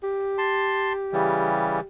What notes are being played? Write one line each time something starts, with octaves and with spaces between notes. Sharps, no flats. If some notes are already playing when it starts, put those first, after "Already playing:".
G4
A5 C6
C#3 E3 G3